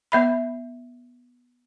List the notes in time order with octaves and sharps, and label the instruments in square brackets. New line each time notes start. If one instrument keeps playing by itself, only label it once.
[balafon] B3 E5 B5